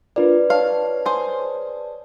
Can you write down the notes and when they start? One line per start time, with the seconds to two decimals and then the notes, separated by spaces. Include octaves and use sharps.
0.16 D4 F4 A#4 B4 D5
0.50 C#5 F5 A5
1.06 G#4 C5